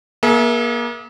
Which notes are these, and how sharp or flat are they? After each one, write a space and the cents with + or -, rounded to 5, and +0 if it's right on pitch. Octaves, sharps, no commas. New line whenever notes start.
A#3 +35 G#4 +45 E5 +0